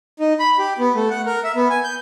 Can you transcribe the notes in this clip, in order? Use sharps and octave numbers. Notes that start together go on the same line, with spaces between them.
D#4
B5
G4
B3
A3
F#5
A#4
E5
B3
G#5
G6